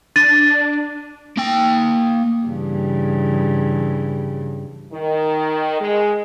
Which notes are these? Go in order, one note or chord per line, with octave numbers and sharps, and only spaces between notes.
D4 A6 D#7
A#3 G5
G2 C#3 E3
D#3
G#3